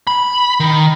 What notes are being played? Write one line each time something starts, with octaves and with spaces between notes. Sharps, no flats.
B5
D#3